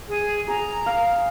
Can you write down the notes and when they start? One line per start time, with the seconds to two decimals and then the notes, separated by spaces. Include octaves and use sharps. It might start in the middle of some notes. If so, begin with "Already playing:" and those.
0.09 G#4
0.48 G#4 A#5
0.86 F5